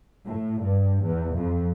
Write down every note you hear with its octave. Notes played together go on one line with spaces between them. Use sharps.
A2
G2
E2
F2